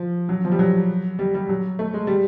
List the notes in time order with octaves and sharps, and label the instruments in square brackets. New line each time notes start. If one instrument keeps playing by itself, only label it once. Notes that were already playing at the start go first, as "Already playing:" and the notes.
Already playing: [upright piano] F3
F#3
F3
G3
F#3
G3
G3
F#3
A3
G#3
G3